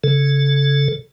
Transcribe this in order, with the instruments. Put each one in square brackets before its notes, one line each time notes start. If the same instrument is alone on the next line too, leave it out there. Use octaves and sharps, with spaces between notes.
[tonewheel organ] C#3 A4